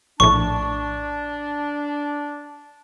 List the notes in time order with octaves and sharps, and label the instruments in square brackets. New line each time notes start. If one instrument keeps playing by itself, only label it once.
[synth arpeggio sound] A#1 A2 [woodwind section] D4 [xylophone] C#6